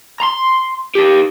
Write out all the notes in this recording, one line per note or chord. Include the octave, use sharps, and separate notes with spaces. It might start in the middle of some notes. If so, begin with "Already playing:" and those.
A#5 C6
D#4 G4